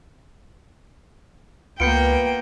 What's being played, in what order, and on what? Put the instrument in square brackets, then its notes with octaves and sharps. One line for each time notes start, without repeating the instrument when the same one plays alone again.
[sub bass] C#2 [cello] A#3 G5 [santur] B3 F4 [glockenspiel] G6 C#7 D7